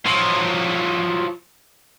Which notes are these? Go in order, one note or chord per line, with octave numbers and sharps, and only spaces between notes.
F3 F#3